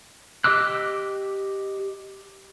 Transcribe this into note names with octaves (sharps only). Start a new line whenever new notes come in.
G4 D#5 D6 E6 F#6